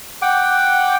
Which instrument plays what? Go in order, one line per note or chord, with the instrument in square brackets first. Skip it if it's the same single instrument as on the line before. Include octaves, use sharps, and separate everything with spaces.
[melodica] F#5 G5 D6